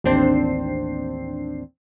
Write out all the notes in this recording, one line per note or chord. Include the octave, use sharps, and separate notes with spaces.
A1 D#2 C4 D4 C5 C7